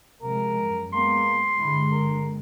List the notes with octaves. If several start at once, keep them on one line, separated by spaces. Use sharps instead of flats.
C3 F3 G#3 A#4
F#2
G#3 A#3 B3 C6
G1 D3 G#3 E4
A#4